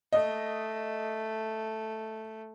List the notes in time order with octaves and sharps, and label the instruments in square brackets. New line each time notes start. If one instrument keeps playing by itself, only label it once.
[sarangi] A3 [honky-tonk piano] D#5